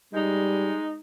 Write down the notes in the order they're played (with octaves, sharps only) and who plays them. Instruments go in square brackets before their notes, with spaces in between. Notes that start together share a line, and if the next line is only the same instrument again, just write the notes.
[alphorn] G3 [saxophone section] G#3 D#4